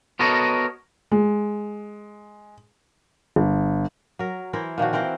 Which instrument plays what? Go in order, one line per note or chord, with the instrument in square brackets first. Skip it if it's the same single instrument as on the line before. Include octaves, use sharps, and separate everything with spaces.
[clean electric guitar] B3 F#4 A4 A#4 C#5 D#5
[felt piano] G#3
G1
[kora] F#3 A#4
E3 E4 A#4 C5
A#2 D#3 F3 F#4
E3 C4 A#4 C5